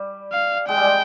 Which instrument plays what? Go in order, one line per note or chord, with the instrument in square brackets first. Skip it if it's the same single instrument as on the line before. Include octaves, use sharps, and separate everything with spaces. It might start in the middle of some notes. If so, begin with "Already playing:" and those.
Already playing: [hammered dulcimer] G3
[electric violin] F5
[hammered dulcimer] G#3 [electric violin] G5
[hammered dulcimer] G3
G#3